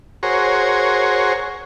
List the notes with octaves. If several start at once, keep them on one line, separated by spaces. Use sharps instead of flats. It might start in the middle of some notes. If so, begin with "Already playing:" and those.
F#4 G#4 A#4 C5 C#5